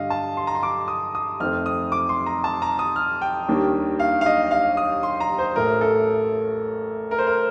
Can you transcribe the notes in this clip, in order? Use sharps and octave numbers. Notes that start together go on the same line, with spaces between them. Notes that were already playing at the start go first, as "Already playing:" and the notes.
Already playing: G2 D3 G3 D#5 F5
A5
C6
A#5
C6
D6
D#6
D#6
F2 D#3 A3 C4 F6
D#6
D6
C6
A#5
A5
A#5
D#6
F6
G5
D#2 D#3 G3 A#3 D4
F5
F5
D#5
F5
D#6
C6
A#5
C5
A1 A2 A3 A#4
A4
A#4
C5
A#4